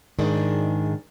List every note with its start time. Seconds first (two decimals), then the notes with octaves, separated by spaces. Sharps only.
0.19 G#2 D#3 D4 G#4